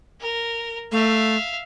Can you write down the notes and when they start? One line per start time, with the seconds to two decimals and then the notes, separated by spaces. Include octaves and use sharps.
0.21 A#4
0.92 A3 E5 F5